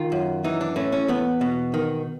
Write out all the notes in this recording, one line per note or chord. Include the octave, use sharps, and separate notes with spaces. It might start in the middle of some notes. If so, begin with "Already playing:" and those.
Already playing: D#3 F4
F#2
E3 D#4
D4
A2 C#4
C#4
E2 B3
B2
D#3